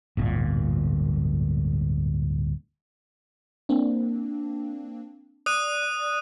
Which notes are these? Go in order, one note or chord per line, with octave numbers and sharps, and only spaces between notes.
D1 G1 A#2
A#3 C4 D4
D5 D#6 F#6 D#7